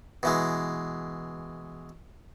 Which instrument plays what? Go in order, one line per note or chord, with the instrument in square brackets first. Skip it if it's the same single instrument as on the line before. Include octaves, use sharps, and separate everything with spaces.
[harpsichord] B2 E3 G#3